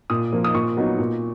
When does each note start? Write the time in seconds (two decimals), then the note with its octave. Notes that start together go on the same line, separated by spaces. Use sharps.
0.10 A#2 D#6
0.33 F3 A#3
0.44 D#6
0.54 A#2 C#6
0.77 F#3 B3 D#4
0.99 A#2